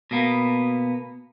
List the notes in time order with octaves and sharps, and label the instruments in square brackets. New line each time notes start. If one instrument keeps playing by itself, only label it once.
[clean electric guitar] B2 A#3 B3